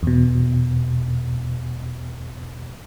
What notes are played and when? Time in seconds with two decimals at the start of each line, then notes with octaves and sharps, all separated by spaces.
0.03 E2 B2